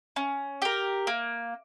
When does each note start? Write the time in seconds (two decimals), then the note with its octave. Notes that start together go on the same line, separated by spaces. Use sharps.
0.16 C#4
0.62 G4 A#4
1.07 A#3